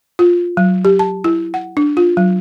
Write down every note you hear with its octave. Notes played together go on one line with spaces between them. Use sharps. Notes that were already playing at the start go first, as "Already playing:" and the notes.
F4
F#3
G4
A5
E4
F#5
D4
F4
F#3